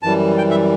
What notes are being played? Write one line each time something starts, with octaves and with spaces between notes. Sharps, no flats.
F#2 E3 G3 A5
G5
E5